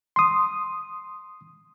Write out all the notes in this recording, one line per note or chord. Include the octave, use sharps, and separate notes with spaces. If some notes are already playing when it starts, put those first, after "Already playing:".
C6 D#6